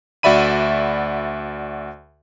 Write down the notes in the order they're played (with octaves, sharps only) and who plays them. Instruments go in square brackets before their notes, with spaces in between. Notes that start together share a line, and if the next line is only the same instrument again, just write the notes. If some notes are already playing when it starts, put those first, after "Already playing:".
[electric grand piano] D2 F#4 D5 E5 B5 D#7